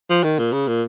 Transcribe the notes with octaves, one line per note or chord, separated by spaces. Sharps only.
F3
D#3
A#2
C#3
A#2